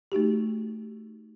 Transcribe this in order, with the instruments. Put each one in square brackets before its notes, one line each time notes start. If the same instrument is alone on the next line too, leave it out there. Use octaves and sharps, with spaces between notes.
[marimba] A3 D#4 F#4 G4